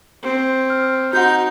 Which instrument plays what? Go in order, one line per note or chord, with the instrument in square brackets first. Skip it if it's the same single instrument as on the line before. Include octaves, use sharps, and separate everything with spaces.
[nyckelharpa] C4
[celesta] F6
[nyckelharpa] D#4 [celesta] F#4 F#5 [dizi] G6